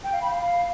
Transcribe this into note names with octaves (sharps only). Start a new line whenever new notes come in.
G5
F5
B5
F5